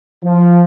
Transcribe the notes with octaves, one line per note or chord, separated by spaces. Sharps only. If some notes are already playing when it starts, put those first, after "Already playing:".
F3